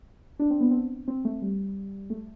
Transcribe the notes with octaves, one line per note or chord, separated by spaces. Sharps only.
D4
C4
B3
C4
C4
A3
G3
A3